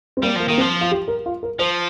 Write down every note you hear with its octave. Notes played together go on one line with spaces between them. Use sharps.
C4
G3 A#3
F3 A#3
D#3 A#3
C4
F3
F4
G4
A#4
F4
A#4
F3 C5